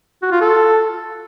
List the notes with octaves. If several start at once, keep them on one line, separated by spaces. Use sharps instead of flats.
F#4
F4
A4